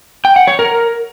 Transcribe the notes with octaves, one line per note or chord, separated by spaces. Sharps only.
G5
F#5
C#5
A#4